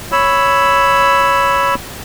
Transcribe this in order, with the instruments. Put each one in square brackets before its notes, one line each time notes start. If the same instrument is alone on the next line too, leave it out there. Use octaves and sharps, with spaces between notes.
[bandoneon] C#5 B5 E6